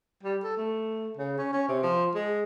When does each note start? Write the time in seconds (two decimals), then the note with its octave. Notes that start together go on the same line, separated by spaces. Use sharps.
0.23 G3
0.43 A4
0.57 A3
1.17 C#3
1.38 C#4
1.53 C#4
1.69 C3
1.83 F3
2.15 G#3